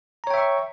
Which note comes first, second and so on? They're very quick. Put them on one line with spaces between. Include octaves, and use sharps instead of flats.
A#5 C#5 G5 E5 C#6